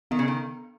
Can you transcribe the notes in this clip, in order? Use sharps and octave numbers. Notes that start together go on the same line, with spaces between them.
D#3 B3
C#3
D#3